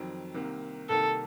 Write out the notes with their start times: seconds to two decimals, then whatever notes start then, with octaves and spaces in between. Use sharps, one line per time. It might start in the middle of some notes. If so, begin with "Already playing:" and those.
Already playing: F2 D#3 F#3 C4
0.34 C2 C3 D#3 A#3
0.89 C2 C3 D#3 A#3 A4